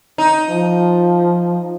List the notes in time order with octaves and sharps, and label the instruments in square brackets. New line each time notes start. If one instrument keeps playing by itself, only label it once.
[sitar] D#4
[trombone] F3